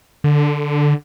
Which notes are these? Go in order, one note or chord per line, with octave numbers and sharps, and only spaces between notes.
D3